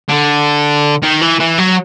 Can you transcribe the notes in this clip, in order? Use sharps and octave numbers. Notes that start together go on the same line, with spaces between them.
D3
D#3
E3
E3
F#3